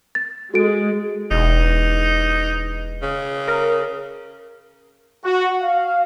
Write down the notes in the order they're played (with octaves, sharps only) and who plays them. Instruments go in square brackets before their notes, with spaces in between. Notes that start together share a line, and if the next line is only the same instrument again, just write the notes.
[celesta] A6
[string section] G#3 [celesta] F#4 A4 D7
[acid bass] E1 [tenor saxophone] D#4
[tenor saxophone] C#3
[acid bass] A#4
[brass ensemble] F#4
F5